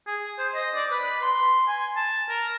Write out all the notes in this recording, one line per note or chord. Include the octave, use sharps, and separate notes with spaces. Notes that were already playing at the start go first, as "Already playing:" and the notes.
G#4
C5
D#5
D5
B4
C6
G#5
A5
A#4